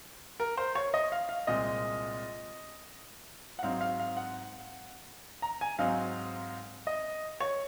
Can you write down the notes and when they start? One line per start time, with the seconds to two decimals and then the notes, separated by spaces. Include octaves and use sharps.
0.40 A#4
0.57 C5
0.75 C#5
0.94 D#5
1.12 F5
1.29 F5
1.47 C2 A#2 G#3 C4 D#5
3.59 F#5
3.63 G#2 F#3 C4 D#4 F5
3.81 F5
4.00 F5
4.17 F#5
5.42 A#5
5.61 G#5
5.78 G#2 F#3 C4 D#4 F5
6.87 D#5
7.40 C#5